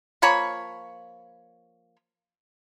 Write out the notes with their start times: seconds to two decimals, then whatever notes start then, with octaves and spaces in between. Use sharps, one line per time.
0.22 F3 A#3 C#5 B5